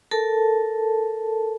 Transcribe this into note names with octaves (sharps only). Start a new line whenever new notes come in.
A4 A#4 A5